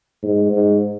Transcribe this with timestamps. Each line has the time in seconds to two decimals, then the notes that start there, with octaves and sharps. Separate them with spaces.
0.23 G#2
0.52 G#2